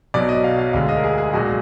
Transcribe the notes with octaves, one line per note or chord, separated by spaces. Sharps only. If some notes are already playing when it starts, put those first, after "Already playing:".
B1 B2 F#3 D5
D#5
F5
F5
D2 D3 G#3 F5
D#5
A#4
G#4
G#4
B1 A#2 G#3 F#4